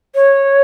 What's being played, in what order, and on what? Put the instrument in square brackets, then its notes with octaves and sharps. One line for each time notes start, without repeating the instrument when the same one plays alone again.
[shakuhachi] C#5